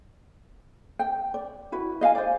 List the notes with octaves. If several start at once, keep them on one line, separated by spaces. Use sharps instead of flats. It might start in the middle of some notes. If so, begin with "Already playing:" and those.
G5
D5
E4 F#4 B4
D#5 F5 F#5 G#5
C5 D5